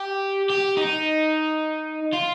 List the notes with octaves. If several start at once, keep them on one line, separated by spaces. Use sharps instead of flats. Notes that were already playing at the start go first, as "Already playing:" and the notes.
Already playing: G4
G4
D#4
F4